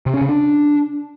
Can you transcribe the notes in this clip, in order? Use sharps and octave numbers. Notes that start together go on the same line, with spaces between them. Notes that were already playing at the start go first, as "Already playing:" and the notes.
C3
C#4
C#3
D4